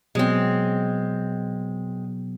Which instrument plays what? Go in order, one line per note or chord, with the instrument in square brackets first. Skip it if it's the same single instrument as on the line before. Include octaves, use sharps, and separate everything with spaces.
[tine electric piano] B2 F#3 B3 [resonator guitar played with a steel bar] G#3 C4